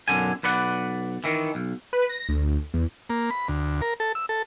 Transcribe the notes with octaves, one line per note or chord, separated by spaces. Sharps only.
B1 F#2 D3 G#5
B1 B4 D5 F#5
D#3 E3
B1
B4
A#6
D2
E2
A#3
B5
D2
A#4
A4
E6
A4